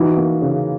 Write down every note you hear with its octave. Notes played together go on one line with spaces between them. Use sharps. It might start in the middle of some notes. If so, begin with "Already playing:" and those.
Already playing: E3 D#4 F#4
A#3
C#3